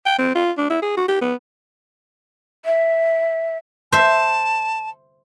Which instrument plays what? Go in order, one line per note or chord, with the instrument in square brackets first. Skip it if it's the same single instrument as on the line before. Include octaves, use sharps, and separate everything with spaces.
[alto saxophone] G5
C4
F4
D4
E4
G#4
F#4
G4
B3
[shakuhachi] E5
[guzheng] C5 E5 [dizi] A5